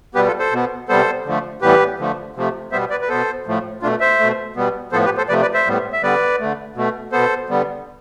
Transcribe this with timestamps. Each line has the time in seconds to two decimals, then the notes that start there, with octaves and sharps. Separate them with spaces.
0.14 B2 G3 B3 G4 B4
0.27 F4 A4
0.39 A4 C5
0.51 B2 B3
0.89 C3 G3 B3 A4 C5
1.25 D3 F3 A3
1.61 A2 E3 G3 B3 G4 B4
1.99 D3 F3 A3
2.36 C3 F3 A3
2.72 B2 G3 B3 C5 E5
2.90 B4 D5
3.02 B4
3.08 B2 B3 A4 C5
3.46 A2 F3 A3
3.82 B2 A3 D4 F4
4.00 C5 E5
4.19 B2 A3
4.56 B2 G3 B3
4.92 A2 F3 B3 A4 C5
5.05 G4 B4
5.17 A4 C5
5.29 C3 F3 A3 B4 D5
5.41 B4 D5
5.54 C5 E5
5.66 A2 G3 B3
5.93 E5
6.02 D3 G3 B3 B4 D5
6.39 D3 A3
6.75 B2 A3
7.12 B2 B3 A4 C5
7.49 D3 G3 B3